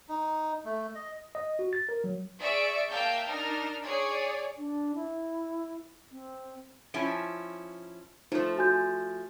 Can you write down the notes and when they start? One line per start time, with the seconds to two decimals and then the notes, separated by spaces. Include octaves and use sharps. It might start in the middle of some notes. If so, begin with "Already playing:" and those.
0.09 D#4
0.65 A3
0.95 D#5
1.35 D#5
1.59 F#4
1.73 A6
1.89 A#4
2.04 F#3
2.39 G#4 D5 E5 C#6 D7
2.90 A#3 E5 F5 G5 A5 G6
3.27 D4 D#4 A#4 F6
3.84 G#4 C#5 D5
4.58 D4
4.95 E4
6.12 C4
6.94 F3 C#4 E4 D7
8.32 F3 A3 D#4 F4 C5
8.57 F#4 G#5 G6